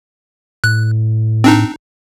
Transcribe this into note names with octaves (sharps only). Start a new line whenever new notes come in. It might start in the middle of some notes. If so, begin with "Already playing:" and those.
A2 F#6
C4 D4 D#4